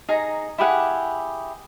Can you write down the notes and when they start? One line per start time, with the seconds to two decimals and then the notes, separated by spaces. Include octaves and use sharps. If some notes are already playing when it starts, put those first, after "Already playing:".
0.09 D#4 G#4 A#5
0.58 E4 G4 G#4 F#5